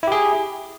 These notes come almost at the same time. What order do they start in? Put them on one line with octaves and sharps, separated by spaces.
E4 G4 G#4